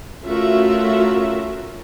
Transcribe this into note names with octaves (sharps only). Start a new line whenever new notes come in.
A3 C#4 F4 F#4 A#4 E5